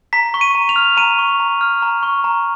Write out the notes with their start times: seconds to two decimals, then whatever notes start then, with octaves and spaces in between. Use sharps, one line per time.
0.13 A#5 B6
0.34 C#6
0.41 D#7
0.55 A#5
0.69 F7
0.76 F6
0.97 A#5 D#7
1.19 C#6
1.40 A#5
1.61 F6
1.82 A#5
2.03 C#6
2.24 A#5